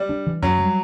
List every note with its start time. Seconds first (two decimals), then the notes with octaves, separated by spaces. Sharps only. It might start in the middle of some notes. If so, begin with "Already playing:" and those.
Already playing: G3
0.09 D4
0.27 E3
0.42 F#2 F#3
0.59 G3